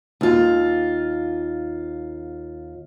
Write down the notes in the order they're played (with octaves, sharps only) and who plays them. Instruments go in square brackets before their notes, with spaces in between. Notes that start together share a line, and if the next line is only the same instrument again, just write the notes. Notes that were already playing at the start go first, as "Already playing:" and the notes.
[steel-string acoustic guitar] D#2 F4